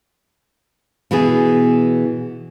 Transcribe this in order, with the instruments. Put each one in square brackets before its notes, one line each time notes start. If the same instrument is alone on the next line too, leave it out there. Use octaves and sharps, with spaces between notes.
[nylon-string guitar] B2 E3 B3 G#4